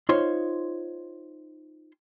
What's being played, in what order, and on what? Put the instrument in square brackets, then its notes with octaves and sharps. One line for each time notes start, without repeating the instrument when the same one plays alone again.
[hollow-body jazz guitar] D#4 F4 C5 C#5 C6